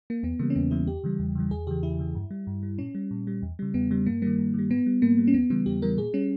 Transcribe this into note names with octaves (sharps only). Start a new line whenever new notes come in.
A#3
E2 B3
C#3 E3 G3 A#3
C#4
E2 B3
C#3 E3 G3 E4
E2 G4
C#3 E3 G3
E2
C#3 E3 G3
E2 G#4
C#3 E3 G4
E2 E4
C#3 E3
G2
G3
G2
G3
A#2 C#4
G3
A#2
G3
E2
C#3 G3
E2 B3
C#3 G3
G2 A#3
D#3 G3 A#3
G2
D#3 G3
G#2 B3
G3
G#2 A#3
G3
C#4
E2 B3
C#3 E3 G3 B3
E2 G4
C#3 E3 G3 A#4
A#2 G#4
G3 C#4